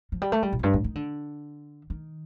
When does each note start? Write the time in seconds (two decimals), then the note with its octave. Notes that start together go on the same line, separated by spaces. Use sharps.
0.12 F3
0.22 G3
0.32 A3
0.43 G3
0.53 A2
0.59 F2
0.63 G2
0.74 A2
0.84 D#3
0.95 D3
1.90 D#3